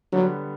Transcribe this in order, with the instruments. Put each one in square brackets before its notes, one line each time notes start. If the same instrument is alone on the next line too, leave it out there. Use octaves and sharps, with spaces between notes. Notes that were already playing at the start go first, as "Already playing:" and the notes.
[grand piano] D3 G3 B3 [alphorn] F#3